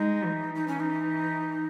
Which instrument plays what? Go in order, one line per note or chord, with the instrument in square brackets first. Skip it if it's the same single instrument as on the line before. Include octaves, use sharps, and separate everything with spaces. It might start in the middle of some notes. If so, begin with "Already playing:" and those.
Already playing: [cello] G#3 [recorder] D#4
[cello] E3
[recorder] D#4
C#4
D#4